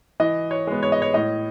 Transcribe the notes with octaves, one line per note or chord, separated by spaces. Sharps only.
E3 D#5
C#5
G#3 B3
C#5
D#5
C#5
A2 D#5